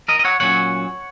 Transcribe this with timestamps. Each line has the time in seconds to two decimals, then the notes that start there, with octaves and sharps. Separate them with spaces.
0.08 A#4 D#5
0.19 D#5
0.25 C#5 F#5
0.40 A#2 F#3 C#4 C#5 F#5